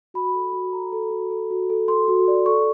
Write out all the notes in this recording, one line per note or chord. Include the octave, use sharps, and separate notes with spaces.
F#4 B5
A4
F#4
A4 A#5
A4
F#4
A4
F#4
A4
A4 C6
F#4
D5
A4 C#6